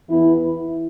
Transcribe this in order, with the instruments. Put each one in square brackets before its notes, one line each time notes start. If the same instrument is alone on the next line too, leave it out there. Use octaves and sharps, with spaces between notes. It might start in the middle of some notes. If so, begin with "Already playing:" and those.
[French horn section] E2 E3 B3 E4